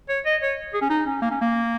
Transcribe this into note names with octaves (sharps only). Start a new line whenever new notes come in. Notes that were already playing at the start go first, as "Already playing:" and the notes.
C#5
D#5
C#5
G#4
C#4
D#4
C#4
A#3
C#4
A#3